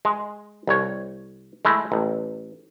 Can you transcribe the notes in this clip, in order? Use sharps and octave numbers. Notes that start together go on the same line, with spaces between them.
G#3
C2 C#5
G#3 A3 E4
A1